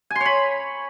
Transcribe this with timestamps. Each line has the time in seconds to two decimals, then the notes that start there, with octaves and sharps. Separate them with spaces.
0.10 G#5
0.15 C6
0.21 C#5
0.26 B5